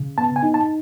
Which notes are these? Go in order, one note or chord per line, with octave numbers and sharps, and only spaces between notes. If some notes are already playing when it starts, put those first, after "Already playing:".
Already playing: C#3
B3 A5
G#5
D#4
A5